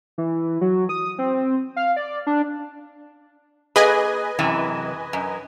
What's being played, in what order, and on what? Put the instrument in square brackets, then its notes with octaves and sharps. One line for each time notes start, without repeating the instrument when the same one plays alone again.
[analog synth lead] E3
F#3
D#6
C4
F5
D5
D4
[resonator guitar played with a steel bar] A#3 G#4 [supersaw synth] B4 D#5 G#5
[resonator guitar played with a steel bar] F#2 C3 E3
F#2